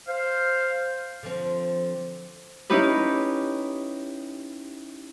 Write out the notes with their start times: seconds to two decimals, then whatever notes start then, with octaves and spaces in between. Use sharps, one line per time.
0.08 C5 F5
1.23 D3 F3 C4
2.70 C#4 D#4 E4 G4 B4